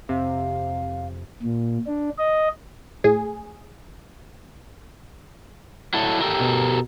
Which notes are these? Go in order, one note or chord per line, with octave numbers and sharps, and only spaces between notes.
F2 C3 F5
A#2
D4
D#5
A2 G#4
F#3 E4 A4
G4 A4 A#4
B2